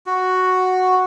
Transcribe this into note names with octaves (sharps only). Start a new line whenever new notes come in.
F#4